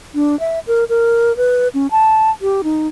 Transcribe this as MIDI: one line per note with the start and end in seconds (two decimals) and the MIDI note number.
0.15 0.38 62
0.40 0.59 76
0.67 0.84 70
0.89 1.36 70
1.37 1.68 71
1.74 1.87 61
1.91 2.30 81
2.41 2.61 67
2.64 2.87 63